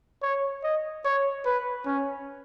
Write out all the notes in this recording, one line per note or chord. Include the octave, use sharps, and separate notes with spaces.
C#5
D#5
C#5
B4
C#4